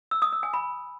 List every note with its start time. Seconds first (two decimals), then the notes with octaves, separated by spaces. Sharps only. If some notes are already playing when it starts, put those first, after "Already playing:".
0.11 E6
0.22 D#6
0.32 E6
0.43 G#5
0.54 B5